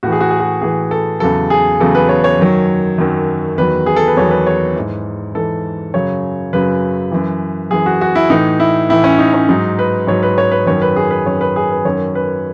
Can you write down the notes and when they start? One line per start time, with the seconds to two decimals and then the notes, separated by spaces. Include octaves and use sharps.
0.03 A2 E3 F#4
0.12 G#4
0.21 F#4
0.30 G#4
0.40 F#4
0.61 A2 E3 G#4
0.91 A4
1.20 E2 C#3 F#3 A4
1.50 G#4
1.80 E2 C#3 F#3 A4
1.95 B4
2.09 C#5
2.24 C#5
2.39 F#2 D#3 F#3
2.98 F#2 D#3 F#3
3.58 E2 D#3 F#3 B4
3.86 G#4
3.96 A4
4.07 B4
4.17 E2 D#3 F#3 C#5
4.31 B4
4.47 C#5
4.76 G#2 E3
5.35 G#2 E3 A4
5.94 F#2 C#3 F#3 C#5
6.53 F#2 C#3 F#3 B4
7.12 F#2 E3
7.71 F#2 E3 G#4
7.86 F#4
8.01 F#4
8.15 E4
8.30 A2 E3 D#4
8.60 E4
8.89 A2 E3 E4
9.04 C#4
9.19 D#4
9.34 C#4
9.49 G#2 F#3 D#4
9.79 B4
10.07 G#2 F#3 C#5
10.23 B4
10.38 C#5
10.52 B4
10.66 F#2 D#3 F#3 C#5
10.82 B4
10.96 G#4
11.11 B4
11.26 F#2 D#3 F#3 C#5
11.41 B4
11.56 G#4
11.71 B4
11.85 F#2 D#3 F#3 C#5
12.15 B4